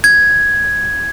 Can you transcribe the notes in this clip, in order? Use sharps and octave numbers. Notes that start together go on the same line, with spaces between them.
G#6